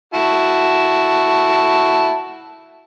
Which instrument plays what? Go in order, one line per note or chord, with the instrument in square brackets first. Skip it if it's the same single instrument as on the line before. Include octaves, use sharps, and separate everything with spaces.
[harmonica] E4 F#4 A5